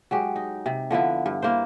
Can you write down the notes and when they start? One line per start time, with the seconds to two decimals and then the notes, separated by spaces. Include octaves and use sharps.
0.11 F#3 G#3 G4
0.36 D#4
0.66 C3
0.91 D3 F3 B3 E4
1.26 G2
1.42 A#3 E4 C5